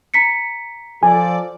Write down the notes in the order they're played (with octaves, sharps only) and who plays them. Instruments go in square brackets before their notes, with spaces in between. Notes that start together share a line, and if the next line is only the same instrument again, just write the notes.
[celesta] A#5 B6 C#7
[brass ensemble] F3 A4 D5 [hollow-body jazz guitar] G#5